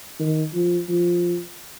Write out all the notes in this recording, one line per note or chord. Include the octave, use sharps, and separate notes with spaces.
D#3
F3
F3